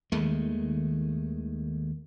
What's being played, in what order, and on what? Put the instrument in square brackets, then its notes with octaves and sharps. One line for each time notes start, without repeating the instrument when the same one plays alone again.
[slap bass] D#2 D#3 G#3 A3